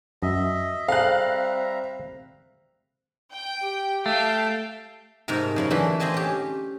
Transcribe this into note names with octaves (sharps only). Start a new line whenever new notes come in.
F#2 D#5 E5
G3 C4 G#4 A4 E5 F5 A#5 F#6
G5
G4
A3 F5 G5 A5
G#2 C3 A3 A#4 A#5
F#2 C#3 A#4
D3 E3 A3
C4 G#4 D#5 G#5 A5
C#4 G4